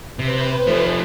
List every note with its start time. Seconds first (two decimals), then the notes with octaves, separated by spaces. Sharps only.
0.19 C3 B4 C5
0.67 F3 A3